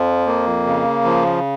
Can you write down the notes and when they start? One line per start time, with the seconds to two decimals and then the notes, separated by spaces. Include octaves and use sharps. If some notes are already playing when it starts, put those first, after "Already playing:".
Already playing: F2 F3
0.26 A#3
0.66 C#3
1.05 F3